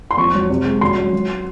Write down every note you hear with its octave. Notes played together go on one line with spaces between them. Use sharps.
C6
F2 C#6
F#3
C3
G#3
F#2 C6
F#3
F#3